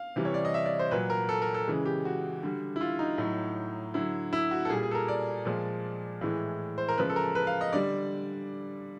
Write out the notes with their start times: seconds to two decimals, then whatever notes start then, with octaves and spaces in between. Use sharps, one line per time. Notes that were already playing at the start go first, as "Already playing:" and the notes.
Already playing: F5
0.16 C3 E3 G3
0.25 C#5
0.34 D5
0.45 D#5
0.54 E5
0.66 D5
0.79 C5
0.91 A#2 F#3 B4
1.10 A#4
1.29 A4
1.42 A#4
1.54 A4
1.67 C#3 E3 G#3
1.85 G4
2.05 F#4
2.43 D3 G3
2.76 E4
2.81 F4
2.99 D#4
3.18 A2 F#3
3.94 D3 F#3 E4
4.33 E4
4.51 F#4
4.65 A4
4.70 A#2 G3 G#4
4.83 G#4
4.91 A4
4.95 A#4
5.08 D5
5.45 A#2 F3 G#3
6.21 A2 E3 G#3
6.78 C5
6.89 A#4
6.97 C#3 F3 G#3 B4
7.10 A4
7.16 A#4
7.35 B4
7.47 F5
7.61 D#5
7.73 D3 G3 D5